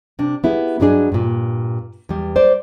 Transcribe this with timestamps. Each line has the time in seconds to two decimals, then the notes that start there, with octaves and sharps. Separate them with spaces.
0.19 C3 D4
0.44 B3 E4 G4 G#4
0.80 G2 F#3 B3 D4 G#4 D#5
1.12 G2 A#2
2.09 E2 G3
2.36 C5 D5